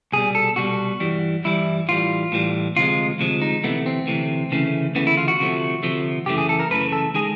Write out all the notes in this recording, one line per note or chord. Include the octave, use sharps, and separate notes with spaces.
C2 B2 G3 G#4
A4
C2 B2 G3 F#4
G2 E3 G3
G2 E3 G3 E4
A2 E3 G3 F4
A2 E3 G3
D2 C3 F3 G#3 F4
D2 C3 F3 G#3
D#4
D2 C3 E3 A3 B3
C4
D2 C3 E3 A3
D2 C#3 E3 A3
D2 C#3 E3 A3 B3
E4
F4
F#4
D2 C3 F3 A3
D2 C3 F3 A3
F#2 C#3 E3 A3 G4
G#4
A4
A#4
F#2 C#3 E3 A3 B4
A4
D#3 G#3 G#4